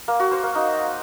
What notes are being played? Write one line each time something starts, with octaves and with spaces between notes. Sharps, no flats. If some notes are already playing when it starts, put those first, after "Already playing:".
A#3
F#4
C5
A#3
D#4